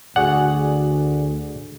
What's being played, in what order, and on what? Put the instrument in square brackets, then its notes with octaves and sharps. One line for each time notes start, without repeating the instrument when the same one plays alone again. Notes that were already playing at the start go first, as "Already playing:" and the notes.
[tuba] D2 [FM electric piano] F#4 G#4 D5 [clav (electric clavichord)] F#5